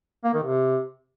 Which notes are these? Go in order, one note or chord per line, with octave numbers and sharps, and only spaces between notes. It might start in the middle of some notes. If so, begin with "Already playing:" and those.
A#3
D#3
C3